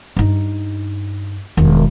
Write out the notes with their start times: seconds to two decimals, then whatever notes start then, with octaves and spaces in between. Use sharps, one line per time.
0.16 G2 D#4
1.57 E1 D#3